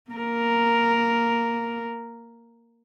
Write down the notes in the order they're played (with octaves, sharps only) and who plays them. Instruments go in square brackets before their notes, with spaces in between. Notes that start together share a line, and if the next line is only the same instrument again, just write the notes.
[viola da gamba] A#3 A#4